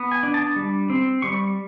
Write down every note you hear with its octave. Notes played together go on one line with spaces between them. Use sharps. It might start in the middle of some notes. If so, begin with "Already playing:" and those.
Already playing: B3
G#5
D4
A5
G3
C4
G3 C#6